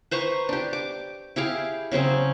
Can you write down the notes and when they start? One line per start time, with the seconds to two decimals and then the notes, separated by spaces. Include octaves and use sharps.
0.11 B4 C5 A#5 C#6
0.49 D4 G4
0.73 D6
1.36 E4 G4 G#4 F5
1.91 C#3 F#3 C4 G#4